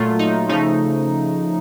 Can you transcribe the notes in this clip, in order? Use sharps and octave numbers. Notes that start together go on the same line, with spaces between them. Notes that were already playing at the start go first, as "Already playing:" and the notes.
Already playing: A#2 F#3 A3 F4
D#4
C#3 F3 A3 D#4